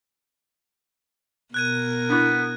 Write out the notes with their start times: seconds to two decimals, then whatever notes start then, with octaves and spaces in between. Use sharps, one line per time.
1.54 B2 A#4 F#6 G#6 D#7
2.10 B3 D4 E4